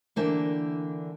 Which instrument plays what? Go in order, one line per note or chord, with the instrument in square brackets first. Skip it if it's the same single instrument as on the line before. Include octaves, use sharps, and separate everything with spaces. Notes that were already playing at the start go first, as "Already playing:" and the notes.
[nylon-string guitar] D3 E3 A#3 D4 G5 A5